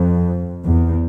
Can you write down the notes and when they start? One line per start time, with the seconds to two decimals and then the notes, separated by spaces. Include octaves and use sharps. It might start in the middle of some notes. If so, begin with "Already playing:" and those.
Already playing: F2
0.63 E2